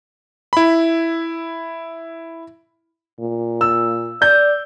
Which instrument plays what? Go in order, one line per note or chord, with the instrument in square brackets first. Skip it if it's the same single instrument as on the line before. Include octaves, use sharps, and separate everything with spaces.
[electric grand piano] E4 B5
[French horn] A#2
[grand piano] E6
[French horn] D5 [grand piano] G6